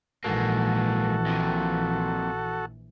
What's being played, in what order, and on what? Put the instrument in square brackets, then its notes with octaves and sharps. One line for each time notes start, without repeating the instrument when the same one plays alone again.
[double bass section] A#1 E3 [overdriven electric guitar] G#2 A#3 [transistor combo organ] F#4 A4
[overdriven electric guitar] F2 A#2